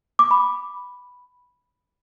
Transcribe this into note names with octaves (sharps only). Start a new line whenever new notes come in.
D6
B5